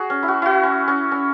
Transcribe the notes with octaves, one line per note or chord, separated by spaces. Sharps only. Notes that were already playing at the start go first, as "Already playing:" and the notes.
Already playing: F#4 G#4
C#4
E4
F#4
E4 F#4
C#4
C#4
C#4